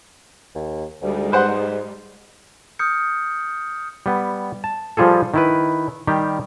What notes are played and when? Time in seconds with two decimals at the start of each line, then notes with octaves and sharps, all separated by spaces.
0.55 D#2
1.02 D2 G3 G#3 D#4
1.32 G#2 B4 C5 F#5
2.79 D#6 F6 G6 C#7
4.06 G3 B3
4.64 A5
4.97 F3 G3 F4 G#4 A4
5.34 D#3 E4 B4
6.07 D#3 G3 G4